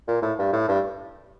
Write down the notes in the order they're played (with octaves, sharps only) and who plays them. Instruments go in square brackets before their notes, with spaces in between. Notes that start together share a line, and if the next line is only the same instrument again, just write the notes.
[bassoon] A#2
A2
G2
A2
G2